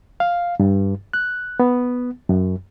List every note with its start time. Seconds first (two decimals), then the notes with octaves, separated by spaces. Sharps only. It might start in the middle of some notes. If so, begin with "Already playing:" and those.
0.20 F5
0.60 G2
1.13 F#6
1.60 B3
2.29 F#2